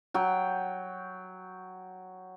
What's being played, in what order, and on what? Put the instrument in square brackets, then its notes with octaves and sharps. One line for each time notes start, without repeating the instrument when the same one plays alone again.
[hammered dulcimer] F#3 G5